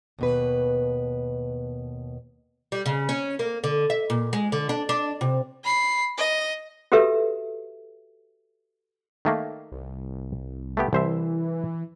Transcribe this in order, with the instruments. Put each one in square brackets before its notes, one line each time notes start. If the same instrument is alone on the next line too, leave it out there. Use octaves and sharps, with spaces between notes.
[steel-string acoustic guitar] D#2 B2 B4
[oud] G3
C#3
C#4
A#3
D3
E5
A#2
G#3
D3
D4
D4
C3
[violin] B5 C7
D#5
[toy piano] F#4 G4 A4 B4 E5
[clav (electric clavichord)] D#3 A3 A#3
[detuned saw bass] C2
[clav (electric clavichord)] A3 B3 G4
[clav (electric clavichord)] C2 C5 E5 [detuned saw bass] E3